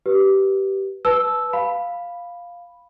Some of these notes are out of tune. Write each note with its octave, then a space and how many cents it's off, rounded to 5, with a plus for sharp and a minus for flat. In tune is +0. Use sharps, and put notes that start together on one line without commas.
G4 -15 B4 -15
B4 +0 A5 -20 E6 -5
F5 +0 B5 +0